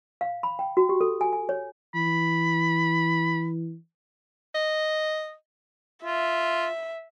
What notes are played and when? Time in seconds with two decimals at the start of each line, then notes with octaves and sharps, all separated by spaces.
0.21 F5
0.43 B5
0.59 G5
0.77 F#4
0.89 G4
1.01 A4
1.21 G#5
1.33 G#5
1.49 C#5
1.95 E3 B5
4.55 D#5
6.05 F4 E5